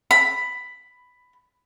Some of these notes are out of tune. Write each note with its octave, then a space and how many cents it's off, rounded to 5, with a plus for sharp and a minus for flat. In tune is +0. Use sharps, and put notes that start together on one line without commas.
B5 +10